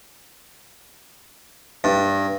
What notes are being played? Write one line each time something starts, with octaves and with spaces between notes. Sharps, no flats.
G2